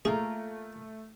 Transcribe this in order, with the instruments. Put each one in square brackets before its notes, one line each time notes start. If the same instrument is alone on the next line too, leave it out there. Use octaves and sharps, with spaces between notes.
[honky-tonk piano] A3 [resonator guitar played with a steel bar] A#3 F4 A#4 [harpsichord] G#4